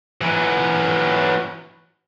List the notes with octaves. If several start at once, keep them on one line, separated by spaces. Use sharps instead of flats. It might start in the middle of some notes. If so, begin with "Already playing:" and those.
E3 F#3